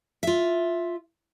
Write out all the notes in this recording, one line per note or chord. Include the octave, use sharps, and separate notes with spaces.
F4 E5